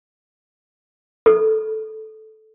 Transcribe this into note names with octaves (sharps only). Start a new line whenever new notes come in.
A4